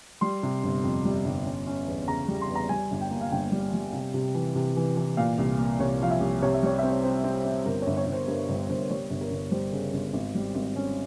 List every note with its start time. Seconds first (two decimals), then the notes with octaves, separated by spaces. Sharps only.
0.21 G3 C6
0.43 C3
0.64 G1
0.83 F2
1.05 G3
1.25 G1
1.45 C#4
1.67 C#4
1.87 E2
2.08 C#3 A#5
2.28 G3
2.42 C6
2.49 E2
2.55 A#5
2.69 G3 G#5
2.91 G1
3.01 G5
3.11 A#3
3.21 F5
3.32 G1 G5
3.52 G3
3.74 G3
3.93 C3
4.14 C3
4.35 E3
4.55 C3
4.76 E3
4.97 E3
5.17 A#2 F5
5.38 C2
5.59 A#3
5.79 C2 C#5
6.01 F3 F5
6.11 E5
6.21 C2
6.42 C3 C#5
6.54 E5
6.63 G3 C#5
6.78 C4 E5
6.92 C#5
7.04 C4 C5
7.24 C4
7.45 C4
7.65 G1 A#4
7.82 C#5
7.87 G1
7.97 C#5
8.07 G1
8.12 C5
8.28 G2 A#4
8.49 G1 C5
8.69 G1 C5
8.90 G3 C#5
9.10 G1
9.21 A#4
9.31 G1
9.51 G3 C5
9.72 C#3
9.93 G1
10.13 G#1
10.35 G3
10.55 G#1
10.76 C#4